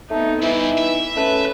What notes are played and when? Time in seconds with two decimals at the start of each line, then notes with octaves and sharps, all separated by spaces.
0.11 A3 B3 C4 D#4
0.43 G2 E3 D#4 E4
0.78 E5
1.17 A3 C#4 B4